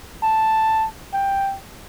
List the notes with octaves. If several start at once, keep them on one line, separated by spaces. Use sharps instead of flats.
A5
G5